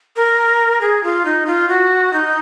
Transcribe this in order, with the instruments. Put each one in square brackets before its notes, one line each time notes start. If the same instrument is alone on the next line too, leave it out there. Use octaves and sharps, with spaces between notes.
[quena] A#4
G#4
F4
D#4
F4
F#4
D#4